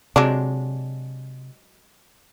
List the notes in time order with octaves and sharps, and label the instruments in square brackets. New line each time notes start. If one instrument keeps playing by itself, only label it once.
[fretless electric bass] C3 [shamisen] F#3 G#3 D4